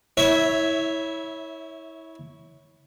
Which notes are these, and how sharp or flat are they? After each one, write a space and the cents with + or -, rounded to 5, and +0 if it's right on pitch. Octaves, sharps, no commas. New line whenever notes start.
E4 -25 C#5 +0 E5 +0